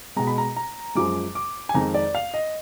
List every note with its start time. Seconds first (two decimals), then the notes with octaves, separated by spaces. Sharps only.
0.16 B2 G#3 A#5
0.27 B5
0.38 A#5
0.56 A#5
0.95 F#2 F3 G#3 D6
1.35 D6
1.69 G#5
1.74 F2 D#3 G#3 A#5
1.94 D5
2.15 F5
2.34 D#5